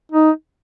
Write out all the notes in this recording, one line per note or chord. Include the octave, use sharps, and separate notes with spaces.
D#4